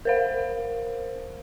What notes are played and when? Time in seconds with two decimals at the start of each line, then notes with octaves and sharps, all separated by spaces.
0.05 A#4 C5 F5